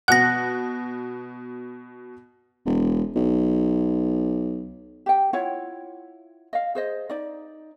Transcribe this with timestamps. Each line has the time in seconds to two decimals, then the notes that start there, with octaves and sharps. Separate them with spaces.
0.08 B2 F#5 F#6 A#6
2.65 E1
3.16 B1
5.06 G4 G5
5.33 E4 F4 C#5 F#5
6.53 D#5 F5
6.75 G#4 C5 D#5
7.10 D#4 D5